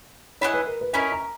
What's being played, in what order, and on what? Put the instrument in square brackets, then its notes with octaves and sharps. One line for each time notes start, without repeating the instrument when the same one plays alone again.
[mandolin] E4 G#4 D#5 F#5 [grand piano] C#5
[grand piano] B4
A#4
B4
[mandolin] C#4 E4 A#4 D#5 [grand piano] G#5
[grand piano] A#5